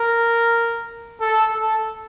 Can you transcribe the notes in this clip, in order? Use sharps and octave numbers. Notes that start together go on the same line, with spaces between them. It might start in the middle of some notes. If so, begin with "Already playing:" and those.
Already playing: A#4
A4
A4